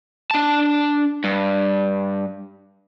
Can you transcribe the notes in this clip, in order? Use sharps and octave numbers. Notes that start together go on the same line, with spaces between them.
D4 A5
G2